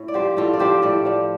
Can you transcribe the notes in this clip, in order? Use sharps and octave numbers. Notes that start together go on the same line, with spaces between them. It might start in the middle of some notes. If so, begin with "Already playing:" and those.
Already playing: A2
D5
F3 D4 G4 C5
A2 F4 A4
D5
F3 D4 G4 C5
A2 A4 D5
F3 D4